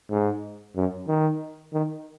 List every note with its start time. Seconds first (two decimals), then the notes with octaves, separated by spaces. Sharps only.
0.10 G#2
0.76 F#2
1.07 D#3
1.73 D#3